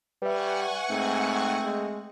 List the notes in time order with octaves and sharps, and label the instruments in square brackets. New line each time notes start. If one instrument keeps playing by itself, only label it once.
[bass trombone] G3 [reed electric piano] B4 E5 [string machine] F#5 G#5 C#6
[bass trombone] G#2 [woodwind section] A3 C4
[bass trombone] G#3